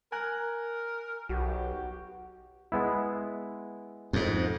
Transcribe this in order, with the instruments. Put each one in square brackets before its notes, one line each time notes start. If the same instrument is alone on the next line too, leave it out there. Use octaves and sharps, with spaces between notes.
[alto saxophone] A#4 [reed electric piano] G#5 A#5 F#6
[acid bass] B1 [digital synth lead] F#4 [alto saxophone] G4
[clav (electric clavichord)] G#3 B3 E4
[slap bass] F2 G#2